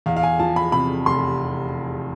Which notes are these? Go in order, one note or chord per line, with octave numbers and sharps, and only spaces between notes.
E2 F5
F5
G#5
F3 A5
B5
C3 B5
F1 C6